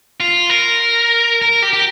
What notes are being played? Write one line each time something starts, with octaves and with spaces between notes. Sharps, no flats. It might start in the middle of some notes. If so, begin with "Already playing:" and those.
F4
A#4
A#4
G4
G4